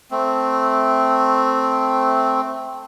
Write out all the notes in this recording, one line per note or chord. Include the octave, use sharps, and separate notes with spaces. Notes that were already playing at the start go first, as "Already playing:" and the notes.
A3 C4